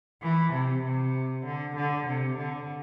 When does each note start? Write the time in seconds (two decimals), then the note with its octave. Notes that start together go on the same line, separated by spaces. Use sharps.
0.22 E3
0.53 C3
0.84 C3
1.46 D3
1.76 D3
2.07 C3
2.38 D3